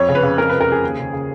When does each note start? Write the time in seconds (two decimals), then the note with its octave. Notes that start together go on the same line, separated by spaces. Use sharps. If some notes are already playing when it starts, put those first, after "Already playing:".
Already playing: F2 C#5
0.08 C#3
0.15 B4
0.23 C#3
0.38 F2 A#4
0.49 C#3 B4
0.61 A#4
0.68 C#3 G#4
0.83 D#2
0.99 C#3
1.13 C#3